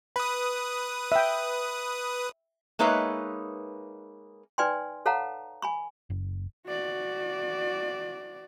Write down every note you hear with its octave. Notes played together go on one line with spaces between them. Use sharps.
B4 B5 D#6
E5 G5
G#3 A#3 D#4 B4 C#5 E5
D#4 B4 D5 G5 G#5 C6
A4 C#5 F5 F#5 A5 A#5
G#5 B5 C#6
F#1
F#4 D5